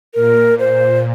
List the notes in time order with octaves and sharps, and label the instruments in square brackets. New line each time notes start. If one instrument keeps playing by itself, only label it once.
[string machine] A#2 [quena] A#4
[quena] C5